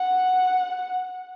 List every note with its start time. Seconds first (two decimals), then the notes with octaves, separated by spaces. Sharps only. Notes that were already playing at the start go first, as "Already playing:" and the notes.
Already playing: F#5